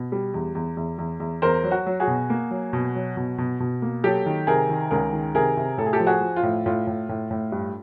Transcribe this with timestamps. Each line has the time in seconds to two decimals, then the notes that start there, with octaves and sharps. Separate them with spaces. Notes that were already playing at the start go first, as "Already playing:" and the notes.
Already playing: B2
0.12 G3
0.34 E2
0.55 E2
0.77 E2
0.98 E2
1.20 E2
1.42 E2 A#4 C5
1.63 F#3
1.71 F#4
1.86 F#3
2.00 F#4 G#4
2.07 B2
2.30 A#3
2.51 F#3
2.73 B2
2.95 F#3
3.17 B2
3.38 B2
3.60 B2
3.82 A#3
4.03 F#3 G4 A4
4.26 D#3
4.47 C3 G#4 A#4
4.69 D#3
4.90 C#2 G#4 A#4
5.13 D#3
5.35 C3 G#4 A#4
5.57 C3
5.78 A2 A4
5.86 G#4
5.93 G4 A4
6.00 F3
6.07 F#4 G#4
6.21 F3
6.36 F4
6.43 A2
6.66 A2 F4
6.87 A2
7.09 A2
7.31 A2
7.52 G2